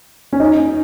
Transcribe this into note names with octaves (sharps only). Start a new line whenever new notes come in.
C#4
D#4